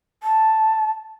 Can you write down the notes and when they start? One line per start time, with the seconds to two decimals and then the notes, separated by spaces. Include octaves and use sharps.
0.23 A5